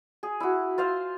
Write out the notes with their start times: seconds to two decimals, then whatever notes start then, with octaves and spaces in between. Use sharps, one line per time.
0.23 G#4
0.40 E4 F#4
0.78 F4 C5 F5